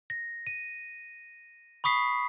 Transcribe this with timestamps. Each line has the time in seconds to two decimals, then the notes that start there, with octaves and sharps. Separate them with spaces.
0.10 A#6
0.47 D#7
1.84 B5 C#6 D#6 B6 C7